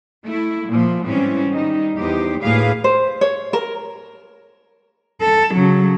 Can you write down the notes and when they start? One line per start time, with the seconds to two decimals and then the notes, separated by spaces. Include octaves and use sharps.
0.24 A3 E4
0.68 A#2 F3
1.05 G#2 E3 G3 C4 C#4
1.50 D#3 G3 D#4
1.96 E2 D#4 G4 C5
2.41 D2 A2 A#3 G#4 B4 F5
2.84 C5
3.21 C#5
3.53 A#4
5.21 A4
5.55 C#3 F#3